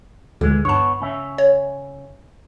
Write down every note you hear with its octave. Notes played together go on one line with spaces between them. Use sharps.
D2 A#2 D3 E3 G#3
G2 B3 C#5 A5
C#3 C#4 E5
C#5